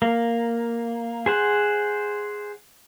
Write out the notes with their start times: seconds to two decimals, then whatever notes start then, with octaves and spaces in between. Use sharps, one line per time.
0.02 A#3
1.26 G#4 C5 F#5